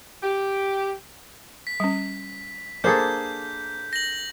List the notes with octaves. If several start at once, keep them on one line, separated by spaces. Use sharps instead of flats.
G4
B6
G3 C#4
A#3 D4 G#4 A4 C5 G6
A#6 F#7